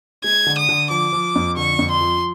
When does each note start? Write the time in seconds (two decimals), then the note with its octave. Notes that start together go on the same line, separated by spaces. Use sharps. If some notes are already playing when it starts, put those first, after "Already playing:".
0.24 G#3 G#6
0.46 D3
0.58 D#6
0.69 D3
0.90 F3 D6
1.13 F3
1.35 F2
1.57 D3 C#6
1.79 F2
1.90 C6
2.01 F3